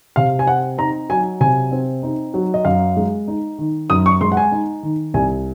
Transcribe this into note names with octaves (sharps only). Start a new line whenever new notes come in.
C3 F5
G#5
C4 F#5
D#4 A#5
F#3 G#5
C3 G#5
C4
D#4
F#3
D#5
F#2 F5
G#3
D#4
D#3
F#2 D#6
C#6
G#3 C6
F#5
G#5
D#4
D#3
C2 G#5